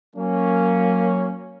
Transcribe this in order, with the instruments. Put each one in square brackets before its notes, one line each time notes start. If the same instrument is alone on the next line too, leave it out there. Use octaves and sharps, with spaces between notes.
[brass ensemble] F#3 A#3 C#4